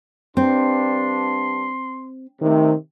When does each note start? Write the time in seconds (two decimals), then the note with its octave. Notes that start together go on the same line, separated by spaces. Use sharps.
0.37 G2 C4 D4 C6
2.42 C3 D#3 A3